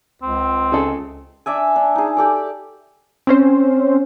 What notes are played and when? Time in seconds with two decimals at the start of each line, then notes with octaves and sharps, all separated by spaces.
0.22 C#2 C4
0.72 C#3 G#4 A4
1.46 D4 D5 E5 G#5
1.76 D4
1.95 D#4 G#4
2.17 G4 A4 D5
3.27 C4 C#4 C5